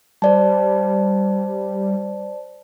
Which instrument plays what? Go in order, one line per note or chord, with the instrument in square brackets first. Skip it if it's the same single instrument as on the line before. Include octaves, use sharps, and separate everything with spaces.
[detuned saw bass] G3 [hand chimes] C5 D5 A5